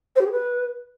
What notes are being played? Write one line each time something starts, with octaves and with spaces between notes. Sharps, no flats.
C5
G4
G#4
B4